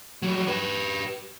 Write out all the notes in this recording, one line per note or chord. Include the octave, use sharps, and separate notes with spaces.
F#3 G3
G4 B4